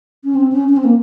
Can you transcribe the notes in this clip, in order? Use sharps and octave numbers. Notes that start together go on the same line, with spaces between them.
C#4
C4
C#4
C#4
C4
A#3